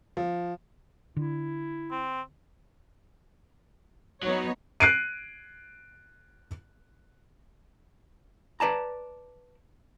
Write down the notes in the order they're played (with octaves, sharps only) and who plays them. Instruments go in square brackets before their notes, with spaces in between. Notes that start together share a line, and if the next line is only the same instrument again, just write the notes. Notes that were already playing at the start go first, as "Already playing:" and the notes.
[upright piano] F3
[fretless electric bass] D3 [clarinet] E4
[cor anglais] C4
[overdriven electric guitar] F#3 [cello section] B3 D#4 C#5
[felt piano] F#6 C7 D7 D#7
[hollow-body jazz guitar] B4 D5 A5 A#5